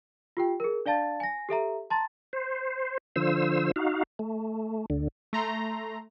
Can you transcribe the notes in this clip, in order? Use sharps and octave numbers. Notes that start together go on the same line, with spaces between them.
F4 G4 G5
G#4 A#4
D4 D5 F5 A5 A6
G#5 A#6
G4 A4 E5 A#5
A5 A#5 C6 A6
C5
D3 F3 C5 E6
D#4 F#4 F5
A3
D2 D3
A3 A#5 C6